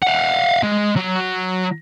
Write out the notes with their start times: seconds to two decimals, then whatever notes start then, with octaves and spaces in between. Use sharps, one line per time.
0.03 F5 F#5
0.63 G#3
0.97 F#3